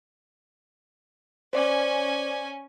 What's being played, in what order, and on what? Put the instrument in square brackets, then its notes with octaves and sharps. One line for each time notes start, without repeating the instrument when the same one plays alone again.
[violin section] C#4 G#5 [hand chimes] C5 D5 D6